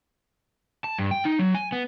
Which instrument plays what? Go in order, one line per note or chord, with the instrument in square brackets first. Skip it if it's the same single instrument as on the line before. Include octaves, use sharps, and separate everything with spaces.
[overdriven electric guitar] A5
G2
G5
D#4
F#3
G#5
B3